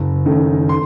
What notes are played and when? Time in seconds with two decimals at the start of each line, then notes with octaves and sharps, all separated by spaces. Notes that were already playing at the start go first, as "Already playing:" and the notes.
Already playing: F#1
0.25 F#2 D#3 A3
0.69 C6